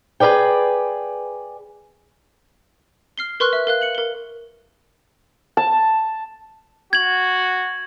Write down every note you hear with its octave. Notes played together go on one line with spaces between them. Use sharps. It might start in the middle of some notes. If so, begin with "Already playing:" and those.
G#4 A#4 B4 D5 G5
F6 C7 G7
A#4 B4 C6 C#6 F6 F#6
E5
A#4 F5 F#6
C#7 F#7
A#4 G7
A5
F#4 G#6 F#7